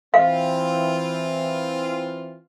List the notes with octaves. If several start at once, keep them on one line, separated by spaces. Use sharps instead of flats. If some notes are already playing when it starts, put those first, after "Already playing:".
E3 C4 F4 F5